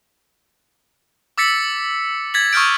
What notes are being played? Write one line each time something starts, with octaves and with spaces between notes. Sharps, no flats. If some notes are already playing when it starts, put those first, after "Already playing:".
D6 E6 A6 B6 C#7
G#6 A6 B6 F#7
C#6 D#6 F6 G6 D7